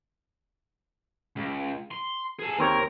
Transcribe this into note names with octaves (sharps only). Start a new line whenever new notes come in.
C#2
C6
G#4 A4
D#2 C4 A#4 C#5